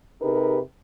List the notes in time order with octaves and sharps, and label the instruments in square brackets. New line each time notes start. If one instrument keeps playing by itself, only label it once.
[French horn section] C3 D#4 G4 G#4 A#4 B4